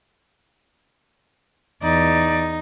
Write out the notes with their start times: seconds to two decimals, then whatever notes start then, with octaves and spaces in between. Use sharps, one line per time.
1.83 E2 D#4 D5